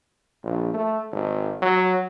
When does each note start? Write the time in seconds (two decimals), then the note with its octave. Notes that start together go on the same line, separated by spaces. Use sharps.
0.44 A#1
0.74 A3
1.12 G#1
1.62 F#3